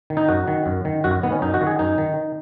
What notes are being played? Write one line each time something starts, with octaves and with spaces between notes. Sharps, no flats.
D#3
D#4
F#2 F#4
D#3
F#2
D#3
F#2 F#4
D#3 B3
C#4
F#2 D#4
F#4
D#3
G#4
F#2 D#4
D#3